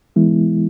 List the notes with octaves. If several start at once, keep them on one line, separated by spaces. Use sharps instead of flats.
E3 G#3 B3 E4